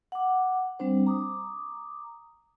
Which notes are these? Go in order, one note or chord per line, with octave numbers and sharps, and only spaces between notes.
F#5 D6
G3 C4 D4 C5
A#5 D6 D#6